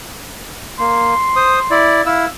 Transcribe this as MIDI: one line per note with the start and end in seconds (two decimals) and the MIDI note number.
0.79 1.14 58
0.79 1.78 84
1.36 1.59 72
1.36 1.59 87
1.71 2.02 64
1.71 2.02 74
2.06 2.26 64
2.06 2.26 77
2.06 2.26 88